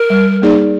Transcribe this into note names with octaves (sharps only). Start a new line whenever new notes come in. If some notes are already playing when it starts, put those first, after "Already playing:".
Already playing: A#4
G3
A#3 D#4 G#4 D5